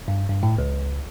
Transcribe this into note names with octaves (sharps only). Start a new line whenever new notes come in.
G2
G2
A2
C#2